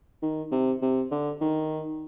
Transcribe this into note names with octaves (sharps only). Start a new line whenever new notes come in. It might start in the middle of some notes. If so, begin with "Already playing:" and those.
D#3
C3
C3
D3
D#3